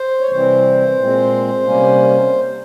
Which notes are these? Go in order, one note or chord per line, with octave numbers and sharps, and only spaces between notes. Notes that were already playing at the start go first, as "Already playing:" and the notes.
Already playing: C5
C#5
C3 E3 G3 C4 C5
A#2 G#3 C4
C3 G3 A#3 C#4